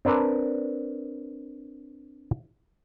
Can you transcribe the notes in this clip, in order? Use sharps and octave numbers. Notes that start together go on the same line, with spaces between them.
C4 D4 A#4 B4 A5